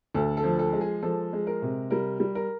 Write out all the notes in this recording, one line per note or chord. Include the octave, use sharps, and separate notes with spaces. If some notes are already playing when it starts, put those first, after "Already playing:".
D2 A4
A4
F3
A4
G#3
G#4
F3 A4
G#3
A#4
C3
G3 A#4
G3
A#4